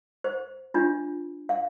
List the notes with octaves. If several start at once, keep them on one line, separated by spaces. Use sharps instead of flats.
C5
D4 F4
F5